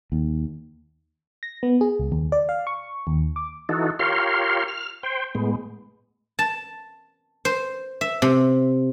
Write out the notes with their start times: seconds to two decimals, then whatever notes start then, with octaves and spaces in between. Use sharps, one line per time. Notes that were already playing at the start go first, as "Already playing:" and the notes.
0.12 D#2
1.43 A#6
1.63 B3
1.81 G#4
1.99 C#2
2.12 D#2
2.32 D5
2.49 F5
2.67 C#6
3.07 D#2
3.36 D6
3.69 E3 D#4 F#4 A4
3.99 F4 G4 A#4 C#5 F5 C6
4.68 F6
5.03 C5 G5
5.35 A2 G#3 B3
6.39 A5
7.45 C5
8.01 E5
8.22 C3